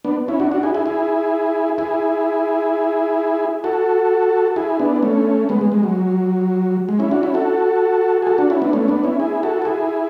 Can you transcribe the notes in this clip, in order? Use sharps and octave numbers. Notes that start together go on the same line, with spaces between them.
B3 D4
C#4 E4
D4 F#4
D4 F#4
E4 G#4
E4 G#4
E4 G#4
E4 G#4
F#4 A4
E4 G#4
B3 D4
A3 C#4
G#3 B3
G#3
G#3
F#3
G#3
C#4 E4
D4 F#4
C#4 E4
F#4 A4
G#4
F#4 A4
D4 F#4
C#4 E4
B3 D4
A3 C#4
B3 D4
C#4 E4
E4 G#4
F#4 A4
A4
E4 G#4